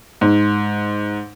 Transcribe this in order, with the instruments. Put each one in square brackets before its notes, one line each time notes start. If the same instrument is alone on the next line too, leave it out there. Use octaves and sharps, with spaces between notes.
[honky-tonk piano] G#2